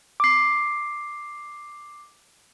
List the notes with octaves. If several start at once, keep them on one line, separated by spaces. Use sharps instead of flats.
D6 C7